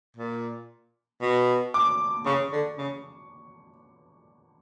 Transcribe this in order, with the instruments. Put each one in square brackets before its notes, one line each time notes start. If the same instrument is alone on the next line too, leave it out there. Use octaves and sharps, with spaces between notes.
[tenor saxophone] A#2
B2
[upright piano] D6
[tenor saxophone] C#3 [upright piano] C#6
[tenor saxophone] D3
C#3